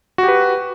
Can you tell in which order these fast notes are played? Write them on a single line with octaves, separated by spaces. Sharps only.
F#4 G4 B4